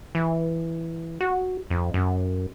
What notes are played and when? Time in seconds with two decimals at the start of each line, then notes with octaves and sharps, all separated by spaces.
0.15 E3
1.21 F#4
1.70 F2
1.94 F#2